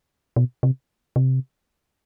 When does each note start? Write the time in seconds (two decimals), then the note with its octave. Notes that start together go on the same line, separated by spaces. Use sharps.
0.36 B2
0.63 C3
1.16 C3